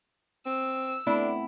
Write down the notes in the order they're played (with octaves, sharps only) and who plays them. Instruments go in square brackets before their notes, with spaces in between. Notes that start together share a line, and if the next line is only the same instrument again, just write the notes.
[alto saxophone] C4 [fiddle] E6
[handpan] A3 B3 C4 [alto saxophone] D4 [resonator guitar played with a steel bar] E4